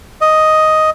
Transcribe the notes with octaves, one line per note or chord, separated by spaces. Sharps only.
D#5